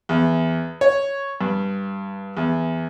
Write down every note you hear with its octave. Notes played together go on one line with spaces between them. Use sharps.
E2
C#5
G2
E2